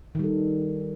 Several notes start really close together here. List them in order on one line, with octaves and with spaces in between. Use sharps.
D#3 G3 A4